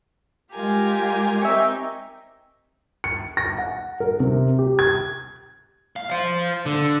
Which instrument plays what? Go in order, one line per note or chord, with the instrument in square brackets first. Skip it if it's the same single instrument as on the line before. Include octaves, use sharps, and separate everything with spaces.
[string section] G#3 F4 [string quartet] G4 A#4 G#5
[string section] C4 D#4 G5 [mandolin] C#5 E5
[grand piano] C#7
A#6
F#5
A#4
C3
G4
G#6
[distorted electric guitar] F5
C5 F5
D3